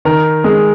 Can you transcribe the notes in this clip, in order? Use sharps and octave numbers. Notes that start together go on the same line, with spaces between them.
D#3 A#4
G#3